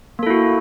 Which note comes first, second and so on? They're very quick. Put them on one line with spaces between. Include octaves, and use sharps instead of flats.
A#3 A4 E4 F#4